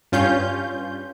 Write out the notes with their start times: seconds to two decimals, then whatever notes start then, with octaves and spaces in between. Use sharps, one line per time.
0.12 G2 C#4 F4 G6